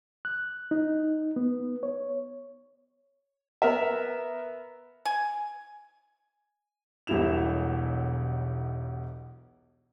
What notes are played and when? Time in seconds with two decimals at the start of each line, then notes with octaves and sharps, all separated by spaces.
0.25 F#6
0.71 D#4
1.36 B3
1.83 C#5
3.62 B3 A#4 E5
5.05 G#5
7.07 E1 B1 G3 E4 E7 F7